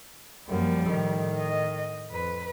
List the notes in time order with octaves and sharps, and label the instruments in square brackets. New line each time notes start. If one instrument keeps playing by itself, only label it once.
[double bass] F#2 A#3 [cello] F3 G3
[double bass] A2 D#3
[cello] D#5
[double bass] F2 [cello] B4